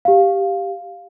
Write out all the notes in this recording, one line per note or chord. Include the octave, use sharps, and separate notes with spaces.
G4 F5